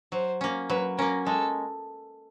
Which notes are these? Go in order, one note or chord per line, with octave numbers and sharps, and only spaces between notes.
F#3 C5
A#3 C#4
F#3 B4
A#3 C#4 A#4
G#3 A4